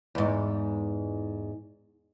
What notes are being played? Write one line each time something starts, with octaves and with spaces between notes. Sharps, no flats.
E2 G#2